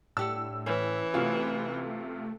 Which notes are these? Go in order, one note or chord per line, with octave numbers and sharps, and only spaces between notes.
A2 D4 G4 F#5 E6
E3 C#4
C3 A3 F4 F#4 G#4 F5